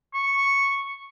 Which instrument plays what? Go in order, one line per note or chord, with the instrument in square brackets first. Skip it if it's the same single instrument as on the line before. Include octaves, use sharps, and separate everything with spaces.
[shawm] C#6